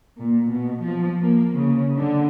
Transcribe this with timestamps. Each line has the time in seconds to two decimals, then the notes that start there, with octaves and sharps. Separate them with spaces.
0.17 A#2
0.50 B2
0.81 F3
1.20 A#3
1.55 C#3
1.96 D3